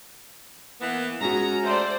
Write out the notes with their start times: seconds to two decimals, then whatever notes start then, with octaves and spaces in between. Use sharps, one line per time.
0.81 E3 A#3 B3
1.21 G#3 C#4 F#4 A#5
1.63 A3 C5 D5